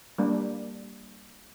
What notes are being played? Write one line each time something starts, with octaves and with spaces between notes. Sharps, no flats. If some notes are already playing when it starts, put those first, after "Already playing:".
G3 A#3 D4 G4